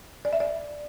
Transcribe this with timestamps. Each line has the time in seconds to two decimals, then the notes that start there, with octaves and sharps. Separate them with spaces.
0.25 D5
0.33 E5
0.40 D5